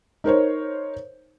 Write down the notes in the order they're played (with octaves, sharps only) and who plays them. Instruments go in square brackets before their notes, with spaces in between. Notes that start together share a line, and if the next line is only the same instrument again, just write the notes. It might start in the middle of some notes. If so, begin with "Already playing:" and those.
[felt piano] D#4 A#4 C5 C#5